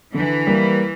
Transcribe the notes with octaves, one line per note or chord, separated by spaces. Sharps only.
D3 E3
G3 A#3